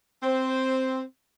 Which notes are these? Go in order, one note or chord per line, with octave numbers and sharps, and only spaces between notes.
C4 C5